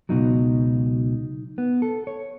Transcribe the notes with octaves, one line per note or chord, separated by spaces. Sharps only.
C#2 B2 F#3 D#4
B3
A4
C#5